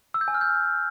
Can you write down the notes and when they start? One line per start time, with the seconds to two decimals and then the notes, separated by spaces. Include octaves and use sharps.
0.14 E6
0.21 G6
0.28 G#5
0.34 F6
0.41 G6